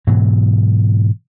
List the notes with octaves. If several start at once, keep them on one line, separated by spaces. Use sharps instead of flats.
G#2 B2 E3 F#3